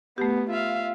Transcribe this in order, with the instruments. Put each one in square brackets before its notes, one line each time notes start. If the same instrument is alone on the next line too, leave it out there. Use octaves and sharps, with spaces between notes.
[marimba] A3 G4 [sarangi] B3
[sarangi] F4 [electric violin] E5 F5